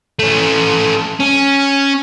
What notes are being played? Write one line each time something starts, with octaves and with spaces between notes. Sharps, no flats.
A3 C#4
C#4